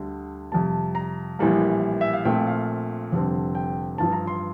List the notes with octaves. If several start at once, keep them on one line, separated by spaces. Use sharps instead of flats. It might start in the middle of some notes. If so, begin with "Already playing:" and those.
Already playing: D2 D3 G3
F2 C3 G3 A5
A#5
A#1 A2 E3 G3 A#3
E5
F5
A#1 A#2 A3 C4 G5
F5
F1 F2 D3 G3 C4
G5
A1 G2 F3 A5
A#5
C6